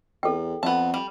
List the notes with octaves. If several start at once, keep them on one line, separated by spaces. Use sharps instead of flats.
E2 A4 G5
F2 B3 A5
G3